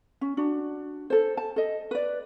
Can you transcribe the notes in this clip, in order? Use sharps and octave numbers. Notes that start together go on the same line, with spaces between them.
C#4
D4 F#4
A4 C5
A5
A4 D#5
B4 D5